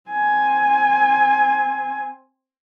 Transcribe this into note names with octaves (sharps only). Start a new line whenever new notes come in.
C4 G#5